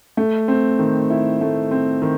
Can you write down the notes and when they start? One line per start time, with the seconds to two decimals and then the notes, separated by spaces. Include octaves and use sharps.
0.17 A3
0.48 C4
0.79 D#3
1.10 E4
1.41 A3
1.71 C4
2.02 D#3